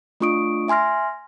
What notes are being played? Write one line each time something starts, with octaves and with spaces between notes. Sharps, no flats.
A3 D4 F4 C#6 D#6 D7
E5 G#5 C6 F6 A#6